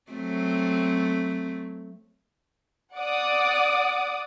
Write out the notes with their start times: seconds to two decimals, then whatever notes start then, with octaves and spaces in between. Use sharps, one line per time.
0.11 F#3 A3 C4
2.96 D5 F#5 D6 D#6